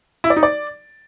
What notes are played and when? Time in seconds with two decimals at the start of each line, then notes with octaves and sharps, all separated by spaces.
0.24 E4
0.30 D5
0.37 D#4
0.43 D5